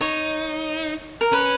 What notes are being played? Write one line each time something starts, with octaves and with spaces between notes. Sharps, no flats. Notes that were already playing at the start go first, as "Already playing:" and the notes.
D#4 C#5
A#4
C#4 B4